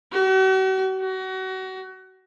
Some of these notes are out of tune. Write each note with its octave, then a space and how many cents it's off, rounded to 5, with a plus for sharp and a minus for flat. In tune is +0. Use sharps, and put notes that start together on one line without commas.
F#4 +45
F#4 +30